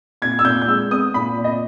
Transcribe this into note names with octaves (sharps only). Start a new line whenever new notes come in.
A#2 G#6
E6
A#2 G6
G6
G#3 E6
B3 D#6
A#2 B5
A#2
D#5